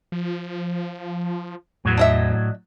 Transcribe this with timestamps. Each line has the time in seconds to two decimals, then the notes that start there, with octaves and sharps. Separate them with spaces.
0.12 F3
1.85 E2 A2 F#3
1.97 D4 D#5 E5